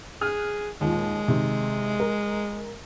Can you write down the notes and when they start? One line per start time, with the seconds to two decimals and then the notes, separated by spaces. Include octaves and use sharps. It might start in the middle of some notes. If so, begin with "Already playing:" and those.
0.21 G#4 F6 F#6
0.81 D#2 A#2 G#3
1.28 C3 D#3
2.00 A#4